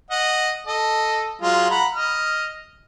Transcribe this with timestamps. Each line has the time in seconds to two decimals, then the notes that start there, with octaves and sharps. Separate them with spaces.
0.11 D#5 F#5
0.67 A4 D#5
1.42 F#3 G#3 F4
1.71 F#5 A#5 B5
1.95 D#5 F6